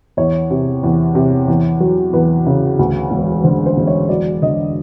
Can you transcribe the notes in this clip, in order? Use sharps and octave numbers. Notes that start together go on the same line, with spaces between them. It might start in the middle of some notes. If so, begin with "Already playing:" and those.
E2 C#5
C3
E2
C3
E2
F#3
E2 B4
C#3
D2
E1
D3 C5
C5
E1
C#5
F#3 D5
D3 D#5